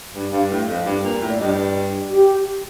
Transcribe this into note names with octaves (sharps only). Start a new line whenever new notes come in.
G2
G2 F5
A2
F2 F5
G2
A#2
A2
D5
G2 D#5
G4